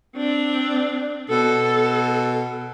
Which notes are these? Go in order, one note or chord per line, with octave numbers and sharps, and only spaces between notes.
C4 D4
B2 A4